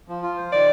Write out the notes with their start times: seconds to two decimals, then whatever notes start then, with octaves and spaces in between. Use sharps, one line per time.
0.08 F3
0.23 F4
0.37 C5
0.52 D#3 D5